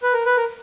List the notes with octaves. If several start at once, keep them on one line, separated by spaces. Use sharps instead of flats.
B4
A#4
B4
A#4